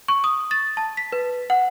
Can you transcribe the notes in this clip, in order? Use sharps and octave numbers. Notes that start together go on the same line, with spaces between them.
C#6
D#6
A6
A5
B6
B4
F#5